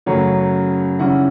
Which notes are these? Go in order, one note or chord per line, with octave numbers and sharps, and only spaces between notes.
F#2 C#3 F#3 A3 C#5
C#3 G3 C#4 E4 F#5